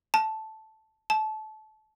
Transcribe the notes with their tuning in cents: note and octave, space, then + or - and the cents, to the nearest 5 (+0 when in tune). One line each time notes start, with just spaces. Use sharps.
A5 -5
A5 -25